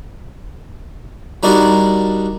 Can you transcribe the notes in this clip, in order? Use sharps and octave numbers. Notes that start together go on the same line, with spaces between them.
G3 D4 D#4 F#4 A#4 D5